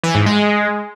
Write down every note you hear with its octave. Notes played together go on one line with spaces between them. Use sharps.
E3
G#2
G#3